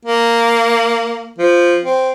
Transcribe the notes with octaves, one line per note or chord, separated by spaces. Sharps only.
A#3
F3
C4